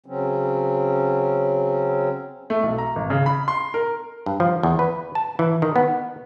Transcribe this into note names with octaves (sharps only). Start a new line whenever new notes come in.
C#3 F#3 C4 C#4
A3
B1
A#5
G#1
C#3
B5
C6
A#4
G2
F3
E2
B4
A5
E3
D#3
B3